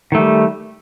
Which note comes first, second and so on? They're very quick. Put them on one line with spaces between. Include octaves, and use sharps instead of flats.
D#3 A3 G3